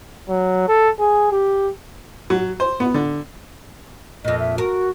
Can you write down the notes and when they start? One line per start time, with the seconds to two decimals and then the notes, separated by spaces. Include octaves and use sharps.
0.29 F#3
0.68 A4
0.99 G#4
1.32 G4
2.30 F#3
2.60 C5
2.80 B3
2.94 D3
4.24 F2 A#2 D#5
4.39 E5
4.58 F#4 A#4